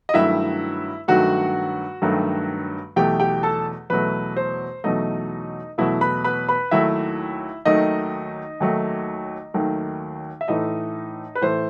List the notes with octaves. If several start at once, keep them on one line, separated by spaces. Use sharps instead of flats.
D#5
G2 D#3 F#3 A3 E4 E5
G2 D#3 F#3 A3 F#4 F#5
G2 D#3 F#3 A3
E2 B2 F#3 A3 G4 G5
G4 G5
A4 A5
E2 B2 F#3 A3 B4
C5
E2 B2 F#3 A3 D#4 D#5
E2 B2 F#3 A3 E4 E5
B4 B5
B4 B5
B4 B5
D#2 D#3 F#3 A3 E4 E5
D#2 D#3 F#3 A3 D#4 D#5
D#2 D#3 F#3 A3
D#2 D#3 F#3 A3
E5
A2 E3 A3 D#4 D#5
B4
A2 E3 A3 C5